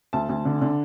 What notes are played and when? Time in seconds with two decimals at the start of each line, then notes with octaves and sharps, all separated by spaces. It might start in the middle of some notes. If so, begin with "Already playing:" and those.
0.13 D2 A5
0.29 D2
0.45 D3
0.61 D3